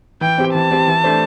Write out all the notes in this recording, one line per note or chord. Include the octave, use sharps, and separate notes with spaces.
E3 G5
C4 G4
E3 A5
C4 G4
E3
A3 D4 C5